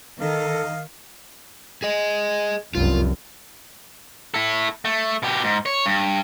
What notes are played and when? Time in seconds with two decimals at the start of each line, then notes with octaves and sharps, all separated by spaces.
0.21 D#3 A4 D#5 F5
1.83 G#4 D#5
2.75 F1 C2 F#2 F4
4.34 E4 A4
4.85 A3
5.23 B2 G4
5.44 G#2
5.66 C#5
5.86 G2